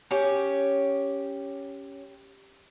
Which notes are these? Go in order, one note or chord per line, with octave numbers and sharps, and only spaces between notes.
C#4 G4